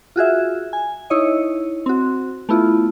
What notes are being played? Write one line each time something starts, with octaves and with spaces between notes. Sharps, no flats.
F4 F#4 G#4 E5
G#5
D#4 E4 C#5 D#5
C4 F#4
A3 B3 E4 F4